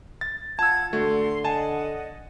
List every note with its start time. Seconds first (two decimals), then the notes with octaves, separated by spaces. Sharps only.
0.21 A6
0.59 F4 F#5 A5 E6 G#6
0.93 D3 A3 F#4 C6
1.44 D#5 F#5 G#5 A5